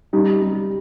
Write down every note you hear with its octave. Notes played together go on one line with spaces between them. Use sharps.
G3 D#4
G3